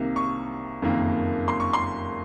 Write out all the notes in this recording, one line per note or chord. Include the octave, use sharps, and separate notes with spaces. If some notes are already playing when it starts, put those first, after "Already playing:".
Already playing: C2 C3 D#3 A#3
C#6
F#1 F2 D#3 A#3
C6
C#6
C6